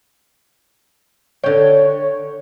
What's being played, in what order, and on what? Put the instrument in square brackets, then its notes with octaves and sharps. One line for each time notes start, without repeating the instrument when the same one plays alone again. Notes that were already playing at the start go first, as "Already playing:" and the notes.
[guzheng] D3 G5 [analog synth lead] C#5